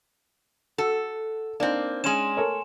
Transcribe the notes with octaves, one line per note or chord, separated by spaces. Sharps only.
F#4 A4
A#3 C4 D4 D#4
G#3 C#4 G#5 C6 E7
A4 A#4 C#5